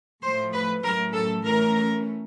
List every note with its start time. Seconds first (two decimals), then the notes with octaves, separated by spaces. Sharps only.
0.22 A2 F3 A3 C5
0.53 B4
0.84 A2 F#3 A3 C#4 A#4
1.14 A4
1.44 E3 A3 C#4 A#4